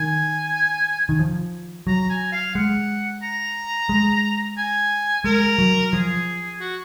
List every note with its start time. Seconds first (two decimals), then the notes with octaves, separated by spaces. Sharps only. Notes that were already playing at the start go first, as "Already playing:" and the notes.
Already playing: D#3 G#5
1.09 D#3
1.19 F3
1.87 F#3 A#5
2.10 G#5
2.32 F5
2.55 G#3 F#5
3.23 A#5
3.89 G#3
4.58 G#5
5.24 G#3 A#4
5.59 F#3
5.93 F3 G#4
6.60 F#4